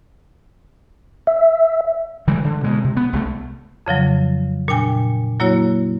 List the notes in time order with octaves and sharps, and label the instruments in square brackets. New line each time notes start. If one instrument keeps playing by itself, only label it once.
[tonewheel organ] E5
[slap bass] D3 E3 G3 G#3
D3
B2 G#3
C3
B3
C2 G#3 A3
[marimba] F2 C#3 F3 F#3
A#2 D4 G5 G#5
F#3 A#3 E4 F#4 C#5